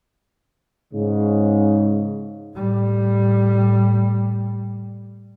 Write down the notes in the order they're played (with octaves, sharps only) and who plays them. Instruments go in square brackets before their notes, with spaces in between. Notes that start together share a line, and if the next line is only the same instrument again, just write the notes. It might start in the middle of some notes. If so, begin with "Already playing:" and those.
[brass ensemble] G#2 C#3
[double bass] A2 G3